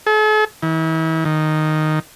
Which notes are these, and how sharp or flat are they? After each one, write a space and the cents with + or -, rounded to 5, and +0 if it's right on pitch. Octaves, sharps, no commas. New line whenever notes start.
A4 -45
E3 -40
D#3 -5